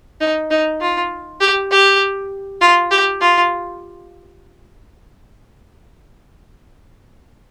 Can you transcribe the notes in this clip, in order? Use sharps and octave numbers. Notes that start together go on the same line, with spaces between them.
D#4
D#4
F4
G4
G4
F4
G4
F4